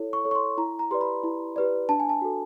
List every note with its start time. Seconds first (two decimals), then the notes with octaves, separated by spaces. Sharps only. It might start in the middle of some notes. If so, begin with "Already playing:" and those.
Already playing: E4 A4 C#5
0.13 C#6
0.25 A4 C#5
0.31 C#6
0.35 C6
0.57 E4 A#5
0.79 A#5
0.91 G4 B4 D5 C6
1.01 B5
1.24 E4
1.56 G4 B4 D5
1.89 D4 A5
2.00 G#5
2.09 A5
2.22 F#4 A4